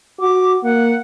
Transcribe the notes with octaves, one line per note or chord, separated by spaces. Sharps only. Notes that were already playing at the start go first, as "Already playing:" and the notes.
F#4 D6
A#3 F#5